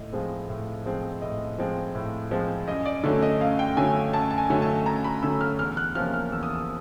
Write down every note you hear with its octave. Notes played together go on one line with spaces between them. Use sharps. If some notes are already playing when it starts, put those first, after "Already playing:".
Already playing: A2 D#5
F3 G#3 C4
A2
F3 G#3 C4
A2 D#5
F3 G#3 C4
A2
F3 G#3 C4
F#2 D#5
D5
D3 F#3 A3 C#4
D#5
F#2 F5
G5
D3 F#3 A3 C#4 G#5
F#2 A5
A5
G#5
D3 F#3 A3 C#4
A5
F#2 A#5
B5
D3 F#3 A3 C#4 E6
F6
E2 F6
F#6
C3 F3 A#3 C#4 F6
F6
E2 E6
D#6
E6